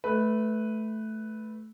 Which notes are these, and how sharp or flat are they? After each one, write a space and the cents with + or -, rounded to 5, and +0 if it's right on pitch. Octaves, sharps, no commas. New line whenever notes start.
A3 -10 B4 +0